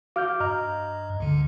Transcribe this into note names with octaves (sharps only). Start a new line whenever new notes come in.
F#4 F5 D6 F6 G6
G2 D#5 A#5 F6
C#2 D3